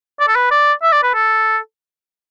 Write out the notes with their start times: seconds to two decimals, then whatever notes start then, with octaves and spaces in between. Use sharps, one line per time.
0.20 D5
0.28 A4
0.36 B4
0.51 D5
0.83 E5
0.93 D5
1.03 B4
1.14 A4